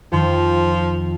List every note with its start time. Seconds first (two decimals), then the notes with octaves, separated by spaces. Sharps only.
0.12 F2 D#3 F3